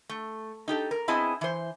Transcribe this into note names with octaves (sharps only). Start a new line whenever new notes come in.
A3
D#4 G4 A4
A#4
B3 C4 E4 G#4 D#5 A5
E3 C5